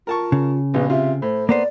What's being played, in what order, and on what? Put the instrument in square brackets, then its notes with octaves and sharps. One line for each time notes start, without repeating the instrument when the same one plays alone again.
[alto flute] F4 [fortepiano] A#4 A5 C#6
[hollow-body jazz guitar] C#3
[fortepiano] A#1 B2 [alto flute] B4
[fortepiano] C3 F4 [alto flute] E5
[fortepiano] A2 [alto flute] C5
[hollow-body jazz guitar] A#3 B3 C5 [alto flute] D5